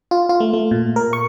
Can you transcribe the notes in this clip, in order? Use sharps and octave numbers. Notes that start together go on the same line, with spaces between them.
F4
F4
A3
A3
A#2
A#4
C#6